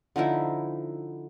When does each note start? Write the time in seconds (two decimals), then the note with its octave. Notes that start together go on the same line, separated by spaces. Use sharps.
0.16 D3 F3 D#4 E4